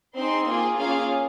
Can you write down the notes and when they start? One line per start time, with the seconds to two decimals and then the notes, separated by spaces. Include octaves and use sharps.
0.15 C4 D#4 G#4 C6
0.47 A#3 F4 G#4
0.77 A#3 C#4 F4 G#4 F5